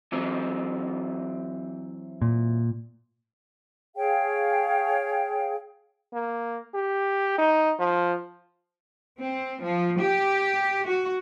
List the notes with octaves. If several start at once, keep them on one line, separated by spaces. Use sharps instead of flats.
E3 F#3 C4
A#2
G#4 C#5 F5 G5
A#3
G4
D#4
F3
C4
F3
G4
F#4